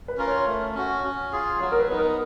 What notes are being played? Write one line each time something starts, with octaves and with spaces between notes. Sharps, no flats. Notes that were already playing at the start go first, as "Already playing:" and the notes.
B4
C#4 F4 A#4
C#5
A3
C#4 F#4
C#4
F4 G#4
F#3 C#5
A#4
B4
B3 D#4
A#4